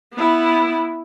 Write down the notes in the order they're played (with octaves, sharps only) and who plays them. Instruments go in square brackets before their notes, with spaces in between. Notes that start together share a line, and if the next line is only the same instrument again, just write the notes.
[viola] B3 E4